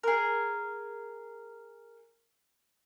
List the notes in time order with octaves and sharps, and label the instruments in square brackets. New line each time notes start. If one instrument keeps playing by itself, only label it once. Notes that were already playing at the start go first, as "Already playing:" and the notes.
[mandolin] G#4 A#4